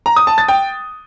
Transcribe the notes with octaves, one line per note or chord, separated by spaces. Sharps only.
A#5
D#6
A5
A6
G5